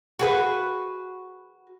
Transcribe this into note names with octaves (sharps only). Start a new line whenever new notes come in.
F#4 G#4 B4